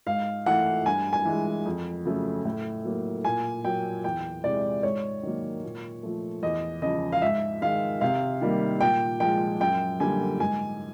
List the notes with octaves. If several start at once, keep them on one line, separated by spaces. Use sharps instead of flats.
G#2 F5
E3 A3 F#5
G2 G#5
G#5
E3 G#3
F2
C#3 F#3 A3
A2
F#3 A#3
A#2 G#5
F#3 A#3 G5
E2 G5
C3 E3 G#3 D5
G#2 C#5
D#3 F#3 A#3
A#2
F3 A3
E2 D#5
C#3 F3 D#5
F5
G#2 E5
D#3 G#3 F5
C3 F5
D#3 G3 A#3
A#2 G5
F3 G#3 G5
F#2 G5
D3 G3 A#3 G#5
G#2 G#5